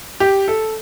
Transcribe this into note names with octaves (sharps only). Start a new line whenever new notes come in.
G4
A4